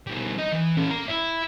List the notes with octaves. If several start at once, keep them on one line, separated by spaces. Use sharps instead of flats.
B2 G3
D#4 D#5
E3
C#4 A4
A#3 A#5
E4